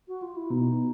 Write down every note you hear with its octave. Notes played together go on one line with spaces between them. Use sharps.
F#4
F4
E4
B2 D#4